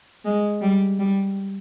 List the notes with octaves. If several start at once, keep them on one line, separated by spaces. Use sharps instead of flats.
G#3
G3
G3